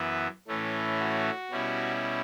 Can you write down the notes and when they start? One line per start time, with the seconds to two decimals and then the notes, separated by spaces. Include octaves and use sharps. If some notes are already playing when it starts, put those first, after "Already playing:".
Already playing: F#2 E3 B3 E4
0.48 A2 E3 A3 C#4
0.99 F#4
1.51 B2 G3 C#4 E4